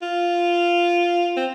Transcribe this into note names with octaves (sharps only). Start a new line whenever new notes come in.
F4
C4